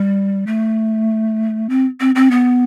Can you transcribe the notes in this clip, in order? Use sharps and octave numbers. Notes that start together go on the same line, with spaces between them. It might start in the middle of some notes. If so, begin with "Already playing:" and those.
Already playing: G3
A3
C4
C4
C4
B3